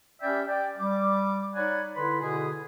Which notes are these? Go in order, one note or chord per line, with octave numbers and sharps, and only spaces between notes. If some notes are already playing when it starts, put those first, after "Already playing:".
C#4 G4 D5 E5 G5 B5
D5 G5
G3 D6
D#4 C#5 D5 F#5 G#5 B5
D3 E4 B4 B5 C6
B2 D3 E4 G#4